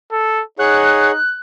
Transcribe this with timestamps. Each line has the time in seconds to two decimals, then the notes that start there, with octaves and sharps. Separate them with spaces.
0.12 A4
0.59 D#4 G#4 C#5 F#5 F#6